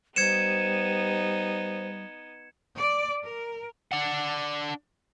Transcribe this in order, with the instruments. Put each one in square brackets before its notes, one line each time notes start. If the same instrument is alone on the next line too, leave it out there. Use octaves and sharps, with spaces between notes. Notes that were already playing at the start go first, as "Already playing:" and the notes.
[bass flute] G3 [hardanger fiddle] B3 D#4 [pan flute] C5 [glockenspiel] G#6 C#7 E7
[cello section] D5
A#4
[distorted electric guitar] D4 F#5